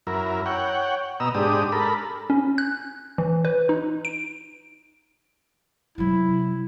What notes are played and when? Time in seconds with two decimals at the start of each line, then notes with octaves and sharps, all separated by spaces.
0.07 F#2 E4 A#4
0.46 C#5 F#5 G5
1.20 B2 D#5 A#5 E6
1.34 G#2 D4 G4 D#6
1.72 A4 A#4 B5
2.30 C#4
2.58 F#6
3.18 E3
3.45 B4
3.69 D#4
4.05 D7
5.98 C3 F#3 E4